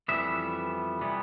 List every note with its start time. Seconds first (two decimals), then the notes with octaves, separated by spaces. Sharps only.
0.08 F2 E3 G3 B3 E5
1.01 C3 E3 G3 B3